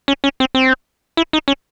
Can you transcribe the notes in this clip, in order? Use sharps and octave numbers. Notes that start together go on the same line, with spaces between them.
C#4
C#4
C4
C4
E4
D#4
C#4